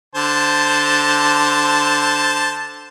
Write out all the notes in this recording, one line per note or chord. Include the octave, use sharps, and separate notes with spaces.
D3 C5 A5